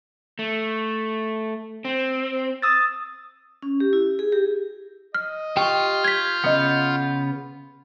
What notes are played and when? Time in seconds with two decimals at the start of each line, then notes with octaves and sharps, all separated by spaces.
0.39 A3
1.85 C4
2.62 D#6 E6 A6
3.62 C#4
3.80 G4
3.93 E4
4.19 G#4
4.32 G4
5.15 D#5 F6
5.57 F4 G4 G5 C#6
6.04 G6 G#6 B6
6.44 C#3 B3 D#5 F#5 D#6